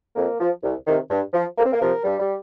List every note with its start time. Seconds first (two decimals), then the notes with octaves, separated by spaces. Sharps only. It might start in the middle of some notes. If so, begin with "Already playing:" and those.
0.16 F2 A#3
0.40 F3
0.63 C2
0.87 C3 D#3
1.10 G2
1.34 F3
1.58 F2 A#3
1.65 C4
1.72 A#3
1.81 C3 F3 A#4
2.04 G2 G3
2.20 G3